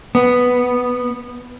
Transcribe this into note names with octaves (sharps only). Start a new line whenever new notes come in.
B3